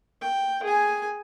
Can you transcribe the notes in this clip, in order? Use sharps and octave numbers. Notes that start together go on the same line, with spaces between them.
G5
G#4 G#5